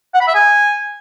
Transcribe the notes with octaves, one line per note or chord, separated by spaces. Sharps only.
F#5
B5
E5
G#5